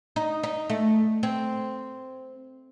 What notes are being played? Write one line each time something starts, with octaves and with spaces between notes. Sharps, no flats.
D#4
D#4
A3
C4